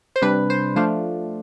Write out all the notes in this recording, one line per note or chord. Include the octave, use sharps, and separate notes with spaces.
C5
C3 G3 D4 B4
C5
F3 A3 D4 F4 C5